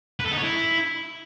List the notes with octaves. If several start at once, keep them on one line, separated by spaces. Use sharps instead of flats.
B4
A4
D#4
C#5
E4